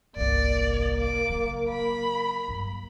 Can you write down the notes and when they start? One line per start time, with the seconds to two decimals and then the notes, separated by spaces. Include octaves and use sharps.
0.16 G1 C2 A#3 D5
0.99 D6
1.30 C#3 F#3
1.69 B5
2.48 G2 F#3